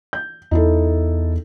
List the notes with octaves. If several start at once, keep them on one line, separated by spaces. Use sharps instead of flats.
G6
E2 D#4 E4 A4